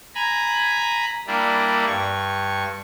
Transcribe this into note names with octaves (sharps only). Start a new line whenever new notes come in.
G#5 A#5 B5
G3 A#3 D4 E4 D5
G2 C#6